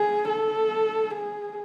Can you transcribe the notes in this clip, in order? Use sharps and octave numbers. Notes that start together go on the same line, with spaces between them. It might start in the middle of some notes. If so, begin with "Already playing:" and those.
Already playing: G#4
A4
G#4